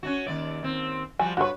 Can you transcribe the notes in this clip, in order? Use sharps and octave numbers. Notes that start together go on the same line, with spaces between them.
C#4 D4 F#4
D#2 G#2 D5
D#2 C4
F3 G3 F#4 G#5
G2 E4 F#4 B4 C#5